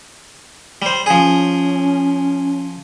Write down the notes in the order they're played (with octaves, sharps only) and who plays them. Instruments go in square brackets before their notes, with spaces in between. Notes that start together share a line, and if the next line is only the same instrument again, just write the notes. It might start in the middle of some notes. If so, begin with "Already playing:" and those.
[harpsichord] G3 C5
[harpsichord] F3 G#4 [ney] C#4